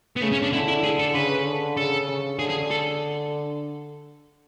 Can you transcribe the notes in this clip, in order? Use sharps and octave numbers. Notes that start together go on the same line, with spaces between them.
B3
C#3 A3
C#4
D4
D3 E4
E4
G#4
A4
C#3 B4
D3
C#3 A4
C#3
D3 G#4
G#4
A4